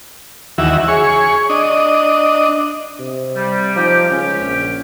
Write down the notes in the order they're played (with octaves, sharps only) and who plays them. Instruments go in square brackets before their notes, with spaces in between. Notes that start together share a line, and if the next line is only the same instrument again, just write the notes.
[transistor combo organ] D#2 E3 F#4 E5
G#4 C#5 C#6
D4 D#5
[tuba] C3
[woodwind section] G3
[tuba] F3 [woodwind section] D#4 G4
[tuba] C#2 [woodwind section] C#4 G4
[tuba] A#1